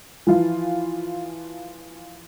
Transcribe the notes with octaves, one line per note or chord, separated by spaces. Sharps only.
E3 F3 F4